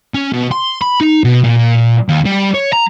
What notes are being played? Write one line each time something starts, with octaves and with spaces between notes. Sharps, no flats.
C#4
B2
C6
B5
D#4
B2
A#2
D#2
G3
C#5
A#5